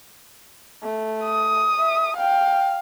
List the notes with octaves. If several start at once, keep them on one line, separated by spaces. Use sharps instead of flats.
A3
D#6
E5
F5 G5